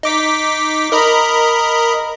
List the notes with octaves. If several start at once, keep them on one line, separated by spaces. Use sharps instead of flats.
D#4 D6 B6
A#4 D#5 B5